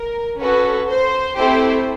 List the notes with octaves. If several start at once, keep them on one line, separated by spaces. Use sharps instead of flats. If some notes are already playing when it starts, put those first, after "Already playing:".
Already playing: A#4
C#4 F#4 A4 B4
C5
A3 C4 E4 G4 C5